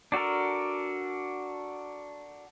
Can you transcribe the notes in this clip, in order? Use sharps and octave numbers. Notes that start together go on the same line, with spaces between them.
D4 F#4 A4 A#4